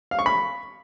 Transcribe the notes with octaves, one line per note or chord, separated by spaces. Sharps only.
F5
C#6
B5